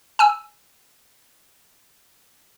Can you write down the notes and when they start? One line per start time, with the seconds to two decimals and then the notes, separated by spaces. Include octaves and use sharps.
0.19 G#5 E6